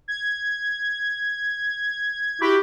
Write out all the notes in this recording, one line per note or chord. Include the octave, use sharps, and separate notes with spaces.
G#6
E4 F#4 G4 B5